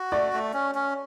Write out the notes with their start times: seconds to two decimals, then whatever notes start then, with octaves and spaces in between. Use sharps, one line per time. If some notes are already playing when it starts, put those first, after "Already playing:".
Already playing: F#4
0.12 A3 D5
0.33 A3
0.54 C#4
0.75 C#4